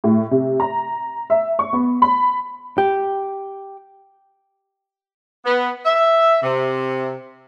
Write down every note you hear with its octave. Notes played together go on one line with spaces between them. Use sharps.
A2
C3
A#5
E5
C#6
B3
B5
G4
B3
E5
C3